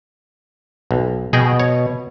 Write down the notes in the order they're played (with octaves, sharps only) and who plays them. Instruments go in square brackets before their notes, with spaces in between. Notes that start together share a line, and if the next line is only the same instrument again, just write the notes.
[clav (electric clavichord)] B1
[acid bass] B2 [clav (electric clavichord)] G#4 D#5 G5
[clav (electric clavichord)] C#5